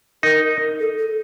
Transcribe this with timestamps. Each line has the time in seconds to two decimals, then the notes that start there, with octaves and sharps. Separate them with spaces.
0.23 D#4 A#4
0.80 A4
0.98 A4